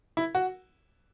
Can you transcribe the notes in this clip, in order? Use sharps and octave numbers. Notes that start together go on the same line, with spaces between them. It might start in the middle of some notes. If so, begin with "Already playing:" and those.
E4
F#4